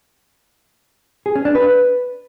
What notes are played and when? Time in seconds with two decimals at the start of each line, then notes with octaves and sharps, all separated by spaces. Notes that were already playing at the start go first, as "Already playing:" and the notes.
1.26 G#4
1.35 C#4
1.45 D4
1.55 B4